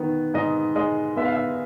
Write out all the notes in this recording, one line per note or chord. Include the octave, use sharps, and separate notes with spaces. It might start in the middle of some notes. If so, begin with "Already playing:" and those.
Already playing: D#3 B3
G#2 D#5
G#3 D#5
B3 E5
F5
E5